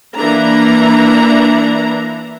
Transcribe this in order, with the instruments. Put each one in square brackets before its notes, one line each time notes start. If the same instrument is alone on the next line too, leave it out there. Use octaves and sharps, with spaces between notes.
[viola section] E3 A#3 D4 A#5